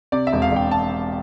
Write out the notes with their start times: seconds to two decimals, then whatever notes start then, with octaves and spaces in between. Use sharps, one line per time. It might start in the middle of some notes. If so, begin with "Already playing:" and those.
0.12 C3 D5
0.27 E5
0.33 E1
0.42 F5
0.52 E1 G5
0.71 A5